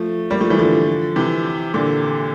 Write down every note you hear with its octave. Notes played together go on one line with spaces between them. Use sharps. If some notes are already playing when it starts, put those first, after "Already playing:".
Already playing: F3 A3
G3 A#3
F3 A3
E3 G3
D3 F3
C3 E3
A#2 D3